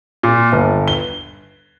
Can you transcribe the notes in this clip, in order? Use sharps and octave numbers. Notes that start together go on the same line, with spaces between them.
A#2
G1
G7